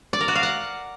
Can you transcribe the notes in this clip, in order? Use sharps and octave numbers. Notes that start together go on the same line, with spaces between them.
D5
A#4
F#4
F5
F#5